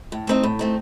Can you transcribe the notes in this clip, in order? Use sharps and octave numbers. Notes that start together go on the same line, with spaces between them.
A2
A3 C4 D#4
A2
A3 C4 D#4